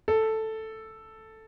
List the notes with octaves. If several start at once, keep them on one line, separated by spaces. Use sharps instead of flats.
A4